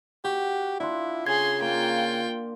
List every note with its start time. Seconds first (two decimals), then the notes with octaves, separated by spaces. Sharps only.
0.24 F#4 G4
0.80 D4 E4 F4
1.27 C#3 G#4 C6 G#6
1.61 A#3 F4 G5